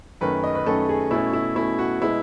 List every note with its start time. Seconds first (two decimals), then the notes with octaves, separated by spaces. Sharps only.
0.21 F#2 D#3 A3 C#4 B4
0.44 D#5
0.55 B4
0.66 F#2 D#3 A3 C#4 A4
0.89 G#4
1.11 B2 A3 C#4 E4
1.33 E4
1.56 B2 A3 C#4 E4
1.79 F#4
2.01 B2 G#3 B3 E4